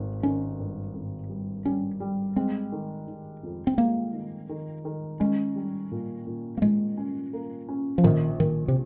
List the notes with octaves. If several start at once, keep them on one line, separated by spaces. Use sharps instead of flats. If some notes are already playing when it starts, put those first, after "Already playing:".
Already playing: G#1 D#3
D#3 C#4
G2
G#1
G3
G3 C#4
G3
G#3 C4
D#3
D#3
F2
C4
G#3 A#3
D#3
D#3
D#3
G#3 C#4
G3
A#2
A#2
A#3
A#2 G#3
C#4
A#3
C#4
F3
A#1 D#3
A#1 D#3
C3